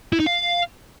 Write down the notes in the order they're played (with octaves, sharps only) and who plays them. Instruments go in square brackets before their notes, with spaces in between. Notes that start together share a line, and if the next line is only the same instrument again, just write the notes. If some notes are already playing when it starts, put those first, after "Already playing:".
[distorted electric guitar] E4
D#4
F5